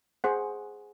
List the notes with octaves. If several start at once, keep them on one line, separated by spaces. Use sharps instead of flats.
G#4 C5 F#5